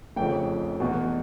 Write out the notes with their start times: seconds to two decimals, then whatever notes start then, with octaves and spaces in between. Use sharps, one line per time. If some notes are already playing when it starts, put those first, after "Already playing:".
0.16 F1 F2 C#3 F3 G5
0.80 F1 E2 B2